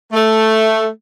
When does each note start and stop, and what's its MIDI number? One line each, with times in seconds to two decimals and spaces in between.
0.13 0.88 57